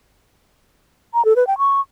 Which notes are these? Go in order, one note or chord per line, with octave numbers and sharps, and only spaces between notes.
A#5
A4
B4
G5
C#6